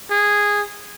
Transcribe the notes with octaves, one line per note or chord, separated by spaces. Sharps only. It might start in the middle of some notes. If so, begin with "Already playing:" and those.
G#4